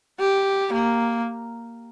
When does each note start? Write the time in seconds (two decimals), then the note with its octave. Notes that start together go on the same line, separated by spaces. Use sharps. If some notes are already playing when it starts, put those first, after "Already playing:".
0.20 G4
0.73 A#3